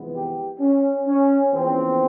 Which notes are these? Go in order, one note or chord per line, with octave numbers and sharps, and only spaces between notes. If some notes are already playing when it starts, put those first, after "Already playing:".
Already playing: F2 C3 E3 G#3 B3
G4
C#4
C#4
E2 C#3 F3 A#3 C4